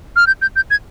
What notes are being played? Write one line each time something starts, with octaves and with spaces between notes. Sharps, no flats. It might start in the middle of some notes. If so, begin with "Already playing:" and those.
F6
G6
G6
G6
G#6